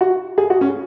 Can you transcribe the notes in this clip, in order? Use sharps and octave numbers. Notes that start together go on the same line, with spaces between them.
F#4
G#4
F#4
C#4